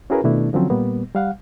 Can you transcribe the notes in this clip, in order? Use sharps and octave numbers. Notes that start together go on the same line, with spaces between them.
C#4 E4 F#4 G#4 A#4 B4
B2 D#3 A3 D4 E4
D3 F3 F#3 C4 C#4
A#2 G3 A#3 B3
G3 F5 F#5